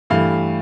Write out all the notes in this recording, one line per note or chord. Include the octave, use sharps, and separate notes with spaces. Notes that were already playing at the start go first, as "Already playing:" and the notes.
G2 E3 A3 F5